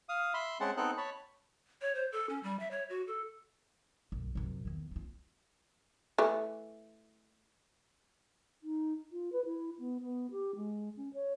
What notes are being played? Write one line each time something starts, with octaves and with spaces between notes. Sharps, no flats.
F5 D#6
E5 B5 C6
G#3 C4 C#4 G#4 F#5 A5
B3 C4 D#4 A4 F#6
C#5 A5 B5
C#5
C5
A4
C#4
G3
E5
C#5
F#4
A4
B1 F#2
F#2 C3
E2 D#3
C4 F4
E3 A3
D#4
F4
B4
E4
B3
B3
G4
G#3
C#4
C#5